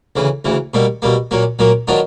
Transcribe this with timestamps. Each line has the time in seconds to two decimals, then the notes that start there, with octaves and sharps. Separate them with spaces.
0.16 D2 C#3 E3
0.45 D2 C#3 E3
0.74 B2 G3 A#3
1.02 B2 G3 A#3
1.31 A#2 F#3 A#3
1.59 A#2 F#3 A#3
1.88 D#3 F#3 B3 D4 F4